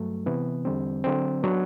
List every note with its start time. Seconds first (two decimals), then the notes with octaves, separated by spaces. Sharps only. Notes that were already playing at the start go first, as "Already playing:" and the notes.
Already playing: G2 F#3 A3
0.26 C3 E3 B3
0.65 E2 D3 G3 C4
1.04 D3 F#3 C4
1.43 F#3 B3 D4